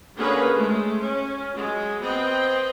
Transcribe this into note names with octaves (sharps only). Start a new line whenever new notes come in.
D3 A#3 C#4 G#4 A#4 B4
G#3 A3
C#4
F#3 G#3
B3 C4 D#5 G5